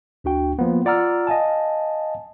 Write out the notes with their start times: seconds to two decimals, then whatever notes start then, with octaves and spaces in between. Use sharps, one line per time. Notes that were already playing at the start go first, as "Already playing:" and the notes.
0.24 D2 D4 F#4 G5
0.59 F3 A#3 B3
0.85 F4 D5 F#5 A#5 E6 F6
1.27 D#5 F5 G#5 A5